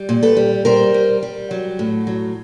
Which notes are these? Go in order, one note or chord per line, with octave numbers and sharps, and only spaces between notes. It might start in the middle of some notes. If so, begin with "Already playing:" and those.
Already playing: G3
A#2
A4 B4
G3
G3 A#4 C5
G3
G3
F#3
A2
F#3